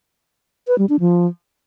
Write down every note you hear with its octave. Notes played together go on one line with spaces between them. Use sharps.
B4
G3
D4
F3